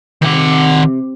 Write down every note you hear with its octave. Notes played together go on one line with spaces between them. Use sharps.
C3 D#3 F#5